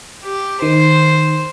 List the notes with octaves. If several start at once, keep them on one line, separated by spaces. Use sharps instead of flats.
G4
D#3 C5